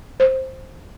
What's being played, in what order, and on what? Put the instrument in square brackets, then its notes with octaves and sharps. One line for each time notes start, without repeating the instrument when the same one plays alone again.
[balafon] C5